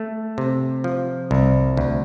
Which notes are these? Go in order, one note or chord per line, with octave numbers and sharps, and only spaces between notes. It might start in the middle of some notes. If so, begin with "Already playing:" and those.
Already playing: A3
C3
F3
C2
D2